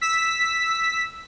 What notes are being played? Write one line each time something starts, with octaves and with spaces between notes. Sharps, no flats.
E6 B6